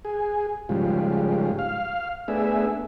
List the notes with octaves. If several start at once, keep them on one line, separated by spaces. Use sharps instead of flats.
G#4
G#2 C#3 F3 G3
F5
A3 B3 D4 G#4 E5